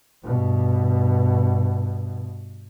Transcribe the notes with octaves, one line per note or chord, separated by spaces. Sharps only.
G2 B2